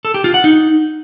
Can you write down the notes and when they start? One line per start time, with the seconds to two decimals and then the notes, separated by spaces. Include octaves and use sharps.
0.05 A4
0.14 G4
0.24 F4
0.34 F#5
0.44 D#4